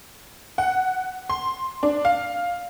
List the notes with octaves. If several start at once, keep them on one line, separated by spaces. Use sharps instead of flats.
F#5
C6
D4
F5